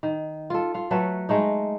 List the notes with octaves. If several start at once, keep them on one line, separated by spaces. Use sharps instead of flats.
D#3
F4 A4
F4 F5
F#3 A3 A4 B4
G#3 A3 D#4